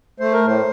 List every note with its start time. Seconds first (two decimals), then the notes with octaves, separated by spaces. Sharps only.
0.20 A3 C5
0.33 A#4
0.43 A2 C5